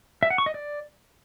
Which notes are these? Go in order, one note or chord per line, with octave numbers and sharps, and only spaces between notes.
E5
F#5
C#6
D#5
D5